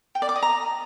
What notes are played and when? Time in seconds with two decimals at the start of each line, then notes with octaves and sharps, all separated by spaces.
0.15 G5
0.22 D5
0.29 D6
0.36 D#5
0.42 A#5